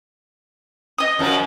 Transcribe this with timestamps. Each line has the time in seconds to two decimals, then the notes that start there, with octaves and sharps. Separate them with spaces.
0.98 D#5 D#6
1.19 F#2 F3 A#4